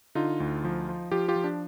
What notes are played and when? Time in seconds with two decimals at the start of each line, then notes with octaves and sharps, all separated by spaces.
0.15 D3 D#4 F4
0.40 D2
0.64 F3
0.89 F3
1.11 F3 F4 G4
1.28 F4 G4
1.36 F3
1.44 D4